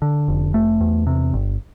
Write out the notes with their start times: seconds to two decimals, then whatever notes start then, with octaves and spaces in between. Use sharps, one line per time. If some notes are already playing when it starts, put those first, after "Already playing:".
0.02 D3
0.28 F1
0.54 A3
0.81 E2
1.07 C3
1.34 G1